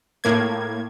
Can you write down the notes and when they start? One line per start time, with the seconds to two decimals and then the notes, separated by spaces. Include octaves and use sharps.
0.24 A2 A#3 G#6